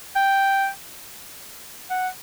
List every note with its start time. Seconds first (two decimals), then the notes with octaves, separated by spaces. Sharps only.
0.16 G5
1.90 F#5